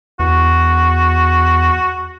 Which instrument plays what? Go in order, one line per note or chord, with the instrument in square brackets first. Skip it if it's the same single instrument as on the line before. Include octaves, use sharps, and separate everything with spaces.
[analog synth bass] E2 [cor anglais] F#4